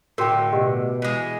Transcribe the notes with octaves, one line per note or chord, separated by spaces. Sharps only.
A2 D3 F#4 A#4 G5 E6
B2 G4 D#5 F#5
E3 G#3